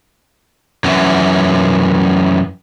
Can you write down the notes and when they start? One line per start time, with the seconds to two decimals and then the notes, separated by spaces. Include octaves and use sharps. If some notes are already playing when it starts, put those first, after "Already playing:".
0.84 F#2 E3